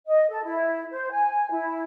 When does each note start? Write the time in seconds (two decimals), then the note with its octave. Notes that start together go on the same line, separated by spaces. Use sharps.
0.06 D#5
0.30 A4
0.44 E4
0.92 C5
1.12 G#5
1.50 E4